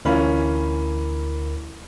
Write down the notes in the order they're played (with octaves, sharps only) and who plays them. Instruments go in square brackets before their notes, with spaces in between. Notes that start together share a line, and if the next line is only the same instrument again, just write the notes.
[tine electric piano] D2 A#4 B5 [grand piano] E3 C#4 F4